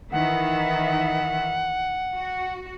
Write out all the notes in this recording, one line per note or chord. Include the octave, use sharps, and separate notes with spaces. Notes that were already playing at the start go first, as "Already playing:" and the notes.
D#3 E3 E5 F#5
F#4